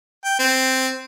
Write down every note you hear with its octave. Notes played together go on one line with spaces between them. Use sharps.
G5
C4